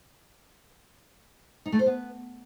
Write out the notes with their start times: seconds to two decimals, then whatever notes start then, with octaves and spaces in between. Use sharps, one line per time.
1.66 D#4
1.72 A3
1.79 C5
1.86 B3